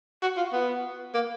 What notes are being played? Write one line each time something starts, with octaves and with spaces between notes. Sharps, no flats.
F#4
F4
B3
A#3